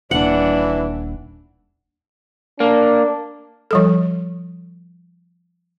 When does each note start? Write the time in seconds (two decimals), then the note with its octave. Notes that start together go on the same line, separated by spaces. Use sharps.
0.11 D#1 E3 D4 F#5
2.60 A#3 D4
3.71 F3 G3 A4